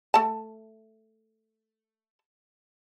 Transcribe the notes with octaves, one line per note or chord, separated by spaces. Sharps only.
A3 A5